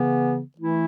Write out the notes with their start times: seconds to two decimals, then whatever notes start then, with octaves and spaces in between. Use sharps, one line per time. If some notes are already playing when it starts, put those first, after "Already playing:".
Already playing: C#3 E3 B3
0.57 E3 A3 E4